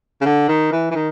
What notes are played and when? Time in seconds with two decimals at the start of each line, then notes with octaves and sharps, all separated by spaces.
0.21 C#3
0.25 D3
0.48 D#3
0.72 E3
0.91 E3
0.95 D#3